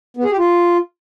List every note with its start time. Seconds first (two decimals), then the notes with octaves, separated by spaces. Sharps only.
0.17 B3
0.24 G#4
0.31 G4
0.38 F4